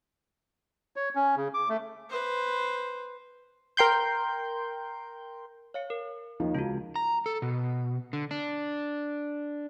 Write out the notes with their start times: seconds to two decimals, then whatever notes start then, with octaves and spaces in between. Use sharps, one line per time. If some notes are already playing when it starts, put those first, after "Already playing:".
0.96 C#5
1.15 C#4
1.36 C#3
1.54 D6
1.69 A3
2.10 B4 C5
3.77 A#4 G5 C6 G6
5.74 C#5 F5 C#7
5.90 A#4
6.40 D#2 D#3 F3
6.55 C#2 F4 F#4
6.96 A#5
7.26 A4
7.42 B2
8.13 D3
8.31 D4